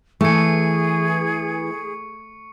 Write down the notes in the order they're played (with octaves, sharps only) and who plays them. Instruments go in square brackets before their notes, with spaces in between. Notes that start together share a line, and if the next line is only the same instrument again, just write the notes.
[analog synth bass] E3 [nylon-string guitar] A3 [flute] G#4 [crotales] C#6 C#7